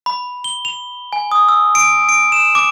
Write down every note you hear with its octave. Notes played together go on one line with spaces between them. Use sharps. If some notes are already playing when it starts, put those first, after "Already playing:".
B5
G7
F7
G#5
D#6
E6
D7
D7
E7
D6